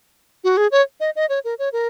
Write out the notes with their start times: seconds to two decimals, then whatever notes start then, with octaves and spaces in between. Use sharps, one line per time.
0.44 F#4
0.57 G#4
0.72 C#5
1.00 D#5
1.16 D#5
1.29 C#5
1.45 A#4
1.59 C#5
1.73 A#4